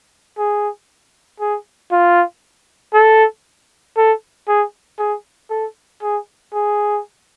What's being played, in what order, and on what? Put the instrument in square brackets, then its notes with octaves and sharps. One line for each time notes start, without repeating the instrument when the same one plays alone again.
[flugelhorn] G#4
G#4
F4
A4
A4
G#4
G#4
A4
G#4
G#4